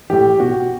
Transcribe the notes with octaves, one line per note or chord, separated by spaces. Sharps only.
A2 E3 G4
B2 F#4